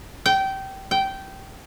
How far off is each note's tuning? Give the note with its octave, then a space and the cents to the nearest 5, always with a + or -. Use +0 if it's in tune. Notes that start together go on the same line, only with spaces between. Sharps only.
G5 -20
G5 -15